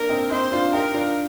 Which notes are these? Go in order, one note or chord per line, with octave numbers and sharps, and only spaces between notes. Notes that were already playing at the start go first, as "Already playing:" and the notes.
Already playing: A#3 D4 A#4
C4 D#4
C4 D#4 C5
D4 F4
D#4 G4 A#4
D4 F4